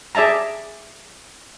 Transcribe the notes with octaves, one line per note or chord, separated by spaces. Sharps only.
G#4 D5 E5 A5 A#5